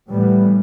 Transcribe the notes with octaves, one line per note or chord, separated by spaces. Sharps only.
A2 E3 G3 B3